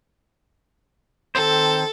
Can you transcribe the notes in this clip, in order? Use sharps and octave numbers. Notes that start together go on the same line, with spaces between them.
D#3 C4 A4 C5